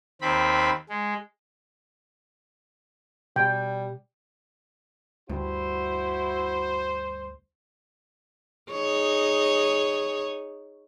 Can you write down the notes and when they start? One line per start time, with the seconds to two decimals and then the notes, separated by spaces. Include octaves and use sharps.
0.22 D#2 C4 B5
0.89 G#3
3.36 B2 G3 G5
5.29 D2 G2 E4 F#4 C5
8.71 D#4 G#4 C#5